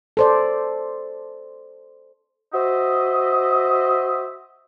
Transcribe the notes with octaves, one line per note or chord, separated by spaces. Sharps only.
A4 C5 D5
F#4 C5 D#5 E5